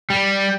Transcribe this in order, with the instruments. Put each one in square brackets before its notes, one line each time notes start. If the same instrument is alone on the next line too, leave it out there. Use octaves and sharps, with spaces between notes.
[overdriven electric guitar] G3